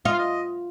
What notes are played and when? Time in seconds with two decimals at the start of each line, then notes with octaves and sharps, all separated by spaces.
0.05 F4 D#5
0.13 F5
0.19 D#5